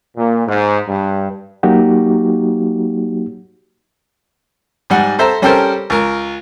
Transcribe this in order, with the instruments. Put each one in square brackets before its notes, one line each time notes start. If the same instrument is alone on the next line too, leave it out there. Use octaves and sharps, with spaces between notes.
[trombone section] A#2
G#2
G2
[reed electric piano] F#3 A#3 D#4 F#4 G4
[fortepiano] G#2 G3 F#5 G#5
A4 C5 E5 A#5
G3 C#4 G4 A4 A#4 C5
C#2 A#4